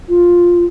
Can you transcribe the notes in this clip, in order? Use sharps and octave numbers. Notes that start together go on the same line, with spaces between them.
F4